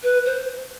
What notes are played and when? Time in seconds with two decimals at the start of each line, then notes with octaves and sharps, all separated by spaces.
0.03 B4
0.25 C5